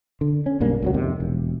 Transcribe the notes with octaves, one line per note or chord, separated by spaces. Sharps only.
D3
C#4
B1 G2 A#3 D4
C#2 B2 F#3
F2 C3 D#3
E1